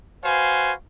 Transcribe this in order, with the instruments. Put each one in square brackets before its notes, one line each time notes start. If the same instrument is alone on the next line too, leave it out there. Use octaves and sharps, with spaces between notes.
[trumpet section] F#4 B4 C5 F5 G#5